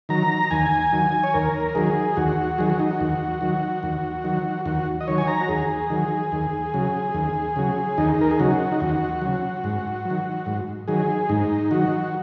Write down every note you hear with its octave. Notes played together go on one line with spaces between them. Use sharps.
D#3 F#3 A#5
D#2 G#5
D#3 F#3
C#5
D#2 A#4
D#3 F#3 G#4
D#2 F#4
D#3 F#3 G#4
F#4
D#4
F#4
D#2
D#3 F#3
D#2
D#3 F#3
D#2 F#4
D#5
D#3 F#3 C#5
G#5
A#5
F#4
D#2 G#4
D#3 F#3
D#2
C#3 F#3
D#2
C#3 F#3
D#2 D#4
A#4
G#4
C#3 F#3 F#4
D#4
D#2 F#4
C#3 F#3
G#2
D#3 F#3
G#2
D#3 F#3 G#4
G#2 D#4
D#3 F#3 F#4